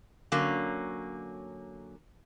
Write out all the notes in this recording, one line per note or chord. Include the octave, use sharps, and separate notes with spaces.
D3 F#3 A#3 C#4